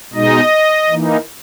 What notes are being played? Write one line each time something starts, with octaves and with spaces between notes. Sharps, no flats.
B2 G#3 D#4 D#5
E3 A#3 D#4